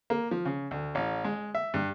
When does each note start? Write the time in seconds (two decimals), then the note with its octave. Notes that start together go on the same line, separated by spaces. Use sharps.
0.10 A#3
0.31 F3
0.45 C#3
0.71 D2
0.95 A1
1.24 G#3
1.55 E5
1.74 G2